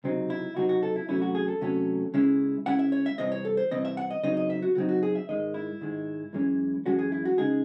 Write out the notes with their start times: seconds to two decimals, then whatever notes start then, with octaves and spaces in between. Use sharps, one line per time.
0.04 C#2 C3 F#3 C4 D#4
0.30 E4
0.56 C#2 C3 F#3 C4 D#4 F#4
0.69 F#4
0.83 A4
0.96 E4
1.08 E2 C3 F#3 A3 C#4 E4
1.22 F#4
1.35 G#4
1.48 A4
1.61 E2 C3 F#3 A3 C#4
2.14 C#3 G#3 C#4 E4
2.66 C#3 G#3 C#4 E4 F#5
2.79 E5
2.92 C#5
3.06 E5
3.18 C2 C3 E3 C4 D#5
3.32 C#5
3.45 A4
3.57 C5
3.71 C2 C3 E3 C4 D#5
3.85 E5
3.97 F#5
4.10 D#5
4.23 C#3 F#3 C4 D#4 D#5
4.37 D#5
4.50 E5
4.62 F#4
4.75 C#3 F#3 C4 D#4 F#4
4.89 F#4
5.03 G#4
5.15 E5
5.29 G#2 D#3 G#3 D#5
5.54 E4
5.81 G#2 D#3 G#3
6.33 F#2 E3 G#3 C#4
6.86 F#2 E3 G#3 C#4 F#4
6.99 G#4
7.12 E4
7.25 F#4
7.38 C#3 G#3 D#4 G#4